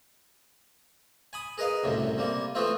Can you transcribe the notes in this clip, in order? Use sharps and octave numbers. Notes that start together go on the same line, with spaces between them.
G#5 B5 D#6
G#4 A#4 B4 D#5 F5
C2 F#2 A2 C3
C3 G3 A#3
E3 A3 B3 C4 E4 F4